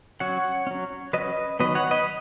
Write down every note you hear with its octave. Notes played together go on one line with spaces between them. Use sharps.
F#3 C#4 C#5 F#5
F#3 C#4
F#3 C#4 B4 D#5
D#3 F#3 B3 B4 D#5
C#5 F#5
B4 D#5